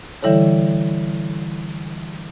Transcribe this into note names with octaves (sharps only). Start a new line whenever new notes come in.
D3 E3 G3 E4 A4 C#5